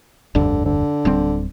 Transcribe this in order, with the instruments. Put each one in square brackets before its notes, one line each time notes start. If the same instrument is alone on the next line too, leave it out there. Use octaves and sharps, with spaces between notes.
[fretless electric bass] F1 D2 G2 [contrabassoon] D3
[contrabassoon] D3
[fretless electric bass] D1 G3 C4